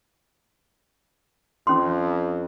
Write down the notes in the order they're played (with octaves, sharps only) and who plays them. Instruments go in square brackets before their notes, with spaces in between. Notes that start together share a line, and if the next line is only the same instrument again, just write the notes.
[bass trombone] F2 [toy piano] C#4 C6